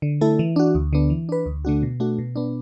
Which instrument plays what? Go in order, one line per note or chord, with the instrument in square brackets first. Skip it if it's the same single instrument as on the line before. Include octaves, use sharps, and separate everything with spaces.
[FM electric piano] D3
A3 E4 A4
E3
D4 F#4
D2
D3 B3 D4
E3
D4 B4
D2
D3 A3 D4 F#4
B2
A3 D4 F#4
B2
B3 D4